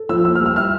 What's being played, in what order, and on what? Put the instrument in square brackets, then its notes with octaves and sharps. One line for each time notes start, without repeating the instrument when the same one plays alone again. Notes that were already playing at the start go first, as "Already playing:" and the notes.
Already playing: [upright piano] A4
[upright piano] F3 [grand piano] E6
[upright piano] A#3 [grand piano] E6
[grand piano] F6
[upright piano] G3
[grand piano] F6
[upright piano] E4 [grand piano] F6